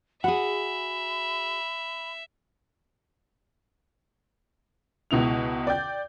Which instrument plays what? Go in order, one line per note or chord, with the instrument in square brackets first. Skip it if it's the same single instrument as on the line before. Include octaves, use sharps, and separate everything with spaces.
[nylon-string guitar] F#4 G#4 [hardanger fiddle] E5 [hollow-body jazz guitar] F#5 [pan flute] B5
[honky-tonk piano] C#2 B2 E4 F7
D5 G5 G6